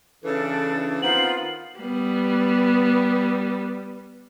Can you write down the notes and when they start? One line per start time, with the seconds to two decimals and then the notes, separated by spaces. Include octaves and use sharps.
0.24 C#3 E3 D4 A4
1.02 D#3 B3 C4 F4 F5 F#7
1.80 G3 B3